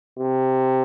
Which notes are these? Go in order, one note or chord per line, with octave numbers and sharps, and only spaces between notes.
C3